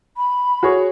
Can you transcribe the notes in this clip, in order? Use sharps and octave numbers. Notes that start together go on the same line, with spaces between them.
B5
F#4 G#4 C#5